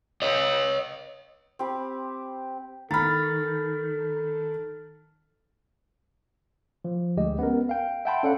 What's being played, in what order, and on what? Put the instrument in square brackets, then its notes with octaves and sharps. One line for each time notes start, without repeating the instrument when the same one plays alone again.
[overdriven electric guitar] C#5 D#5
[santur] C4 G4 B5
[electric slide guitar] D#3 [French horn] A4 [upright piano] A#5 B5 [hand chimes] F6 A6
[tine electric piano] F3
D2 G#3 G4 D#5
B3 C#4 A#4
F5 G5
E5 F#5 G5 A5 B5 C6
C#4 A4 D5 F5 F#5